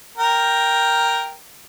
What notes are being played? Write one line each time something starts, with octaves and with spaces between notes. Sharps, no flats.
A#4 G5